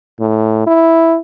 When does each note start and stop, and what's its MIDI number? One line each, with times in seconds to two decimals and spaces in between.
0.20 0.62 45
0.67 1.18 64